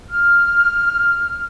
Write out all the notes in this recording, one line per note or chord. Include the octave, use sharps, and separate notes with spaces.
F6